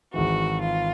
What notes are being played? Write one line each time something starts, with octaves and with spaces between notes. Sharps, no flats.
G#1 G#2 E3 F#4
F4